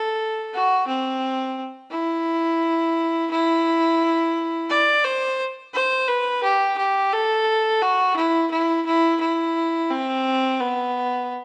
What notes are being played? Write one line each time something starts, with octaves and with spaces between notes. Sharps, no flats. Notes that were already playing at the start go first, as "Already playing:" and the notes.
Already playing: A4
F#4
C4
E4
E4
D5
C5
C5
B4
G4
G4
A4
F#4
E4
E4
E4
E4
C4
B3